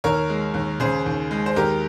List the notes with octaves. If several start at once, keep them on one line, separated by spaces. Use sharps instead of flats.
D#2 A#4 C#5
G#3
D#2
C#3 G#4 C5
D#2
G#3
C5
D#2 G4 A#4